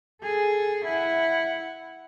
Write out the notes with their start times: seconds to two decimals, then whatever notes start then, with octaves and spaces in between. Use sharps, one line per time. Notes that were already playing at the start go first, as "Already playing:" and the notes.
0.23 G#4 A4
0.85 E4 F#5